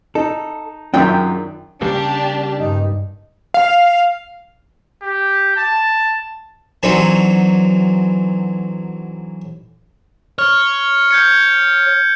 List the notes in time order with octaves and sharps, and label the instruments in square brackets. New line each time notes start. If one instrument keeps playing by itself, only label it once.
[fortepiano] D#4 [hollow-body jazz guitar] A4
[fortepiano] F#2 D#3 E5 [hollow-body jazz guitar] D4 F4 C#5 [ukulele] G#4 G5
[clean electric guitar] C#3 G3 A#3 [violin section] D4 G4
[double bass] G2 [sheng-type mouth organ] D#4
[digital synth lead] F5
[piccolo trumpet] G4
A5
[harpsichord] D3 E3 F#3 C4 D#4 G4
[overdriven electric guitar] C#5 [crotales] F6
[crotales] G6 G#6 C#7